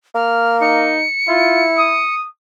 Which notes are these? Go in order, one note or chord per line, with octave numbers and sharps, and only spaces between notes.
A#3 F6
D#4 C#7
E4 F4
D#6